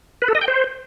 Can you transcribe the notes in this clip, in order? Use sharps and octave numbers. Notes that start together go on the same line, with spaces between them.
B4
A4
D#5
G5
C5